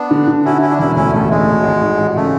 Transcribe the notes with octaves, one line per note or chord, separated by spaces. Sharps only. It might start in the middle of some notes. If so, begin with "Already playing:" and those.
Already playing: B3 D4
D3
D3
C#4 E4 F#4
C#4 E4 F#4
D4
E1 C#4 E4
D2 C#4 E4
A1 A3
A2 G#3
G#1
G#1
G#2
A1
C#3 A3